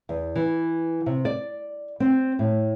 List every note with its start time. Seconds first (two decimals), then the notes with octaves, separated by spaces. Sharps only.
0.09 E2
0.36 E3
1.06 C3
1.25 D5
2.00 C4
2.39 A2